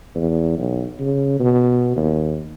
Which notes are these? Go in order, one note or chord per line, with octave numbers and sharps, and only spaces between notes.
E2
B1
C#3
B2
D#2